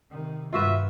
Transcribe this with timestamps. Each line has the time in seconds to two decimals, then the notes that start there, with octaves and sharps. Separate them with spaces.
0.11 C3 D#3
0.53 G2 D#3 F4 F#4 B4 E5